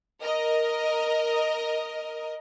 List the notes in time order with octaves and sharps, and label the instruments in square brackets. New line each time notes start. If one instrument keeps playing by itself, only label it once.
[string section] A#4 D#5